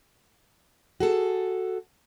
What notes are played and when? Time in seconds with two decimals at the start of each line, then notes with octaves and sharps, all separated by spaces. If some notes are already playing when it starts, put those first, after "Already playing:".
1.00 F#4 G#4 A4